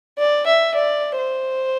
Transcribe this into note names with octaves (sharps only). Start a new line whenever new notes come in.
D5
E5
D5
C5